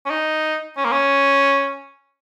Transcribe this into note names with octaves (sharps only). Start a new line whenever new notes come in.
C#4
D#4
C#4
A#3
C#4